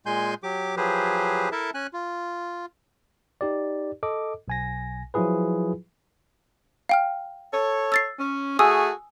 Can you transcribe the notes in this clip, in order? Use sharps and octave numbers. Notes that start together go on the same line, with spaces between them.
A#2 G#3 G#5 C6 G6
F#3 G4 D6
F3 F#3 G4 G#4 B4 C5
E4 A4 A#4 E5 A5
C#4 G#5 F#6
F4
D#4 G4 D5
A4 D#5 D6
B1 G#5 A#6
F3 F#3 E4 F4 G#4 B4
F5 G5 F6
A4 C#5
E6 A6 C7
C#4
A3 F#4 G#4 G#5 D#6 E6